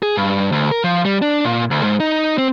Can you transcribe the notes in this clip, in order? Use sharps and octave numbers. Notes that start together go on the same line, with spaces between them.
G#4
G2
D2
A#4
F3
G3
D4
A#2
D2
G#2
D#4
C4